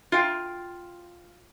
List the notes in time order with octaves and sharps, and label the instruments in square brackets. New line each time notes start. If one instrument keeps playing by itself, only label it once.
[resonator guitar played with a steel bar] F4 F5 G5